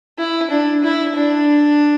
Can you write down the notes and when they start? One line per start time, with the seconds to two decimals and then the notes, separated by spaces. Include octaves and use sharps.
0.18 E4
0.50 D4
0.84 E4
1.15 D4